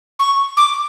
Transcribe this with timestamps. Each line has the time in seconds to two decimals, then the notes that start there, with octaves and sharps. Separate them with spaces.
0.19 C#6
0.57 D6